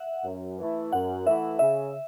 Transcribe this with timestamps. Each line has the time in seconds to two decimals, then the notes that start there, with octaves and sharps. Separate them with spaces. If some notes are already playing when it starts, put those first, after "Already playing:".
Already playing: E5 F#5
0.24 F#2
0.59 E3 A3 E4
0.92 F#2 F#5
1.26 E3 A3 E4 E5
1.59 C#3 E5